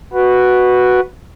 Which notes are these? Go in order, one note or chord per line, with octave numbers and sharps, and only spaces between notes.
F#4 B4